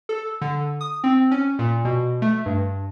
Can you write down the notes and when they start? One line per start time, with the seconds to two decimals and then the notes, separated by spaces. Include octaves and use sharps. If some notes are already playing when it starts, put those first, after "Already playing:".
0.09 A4
0.42 D3
0.81 D#6
1.04 C4
1.31 C#4
1.59 A#2
1.85 B2
2.22 A3
2.46 G2